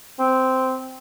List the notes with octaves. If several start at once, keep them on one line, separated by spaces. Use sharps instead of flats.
C4